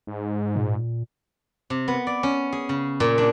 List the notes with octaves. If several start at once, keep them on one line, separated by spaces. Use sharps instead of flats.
G#2
A#2
C3
B3
D5
C#4
G#4
C#3
A#2
D4